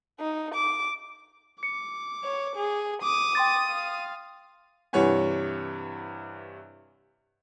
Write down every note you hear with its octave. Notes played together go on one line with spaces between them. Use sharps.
D#4
D6
D6 C#7
C#5
G#4
D6 D#6
G5 C6 A6
F5
G2 C3 E3 C#5 F#5 G#5